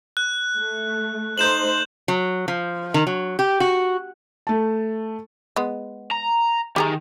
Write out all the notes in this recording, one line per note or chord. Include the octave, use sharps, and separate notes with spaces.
F#6
A3
A3 D#4 C5 G6 E7 F#7
F#3
F3
D#3
F#3
G4
F#4
A3 A5
G#3 B3
A#5
D#3 G4 G#4 A#5